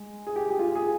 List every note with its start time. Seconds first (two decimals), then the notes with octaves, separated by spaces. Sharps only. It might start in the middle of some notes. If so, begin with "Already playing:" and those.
Already playing: G#3
0.27 G#4
0.36 G4
0.50 G4
0.59 F4
0.75 G#4